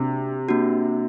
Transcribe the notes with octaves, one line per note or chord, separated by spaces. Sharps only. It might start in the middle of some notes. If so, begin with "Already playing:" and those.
Already playing: C3 A#3 D4 F#4
A#3 D4 F#4